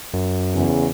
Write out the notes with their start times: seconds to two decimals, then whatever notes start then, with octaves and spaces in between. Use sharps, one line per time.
0.14 F#2
0.54 E2 C#3